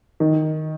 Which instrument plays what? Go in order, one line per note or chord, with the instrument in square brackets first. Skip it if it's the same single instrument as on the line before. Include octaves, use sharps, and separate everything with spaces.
[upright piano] D#3